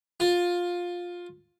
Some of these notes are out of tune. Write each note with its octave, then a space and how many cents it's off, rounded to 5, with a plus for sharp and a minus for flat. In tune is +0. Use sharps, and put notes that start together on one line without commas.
F4 +15